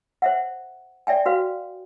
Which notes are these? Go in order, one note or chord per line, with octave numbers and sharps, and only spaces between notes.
C5 E5 F#5
D5 E5 G5 G#5
F#4 B4 F5